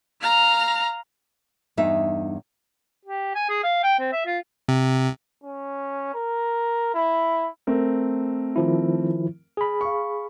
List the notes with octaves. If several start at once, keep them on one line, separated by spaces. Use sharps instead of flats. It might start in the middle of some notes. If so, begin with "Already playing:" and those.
F5 A#5
E2 G2 D#4 E5
G4
G#5
G#4
F5
G5
C4
E5
F4
C3
C#4
A#4
E4
A3 C4 A#4
D#3 F3 E4
G#4 B5
F5 C#6